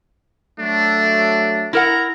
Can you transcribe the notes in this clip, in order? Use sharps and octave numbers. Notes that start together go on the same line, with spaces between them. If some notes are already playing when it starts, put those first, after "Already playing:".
F#3 A3 D4
E4 A#4 F#5 A#5